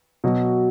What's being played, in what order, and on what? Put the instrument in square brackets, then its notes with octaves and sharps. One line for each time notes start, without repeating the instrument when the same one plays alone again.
[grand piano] B2 F#3